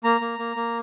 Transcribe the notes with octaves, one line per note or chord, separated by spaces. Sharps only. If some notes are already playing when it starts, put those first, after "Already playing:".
A#3 A#5
A#3
A#3
A#3